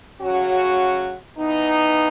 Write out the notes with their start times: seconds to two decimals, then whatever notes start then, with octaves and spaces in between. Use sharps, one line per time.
0.21 C#3 F#3 C#4 F#4
1.38 E3 B3 D#4